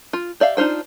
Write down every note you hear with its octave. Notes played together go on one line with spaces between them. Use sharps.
F4
G4 D5 E5 F5
D4 D#4 F4 C5 G5